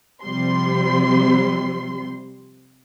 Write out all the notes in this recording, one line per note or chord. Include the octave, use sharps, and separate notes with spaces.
C3 F3 G3 C6